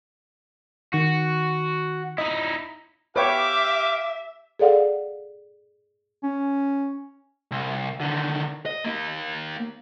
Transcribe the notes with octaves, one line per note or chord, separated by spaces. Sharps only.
D#3 F#4
D#4 E4 D#5
G4 B4 C#5 E5 F5 G5 D6
G#4 A4 D5 F5 F#5
C#4
C2
D3 D#3
D#5
A#3 D#4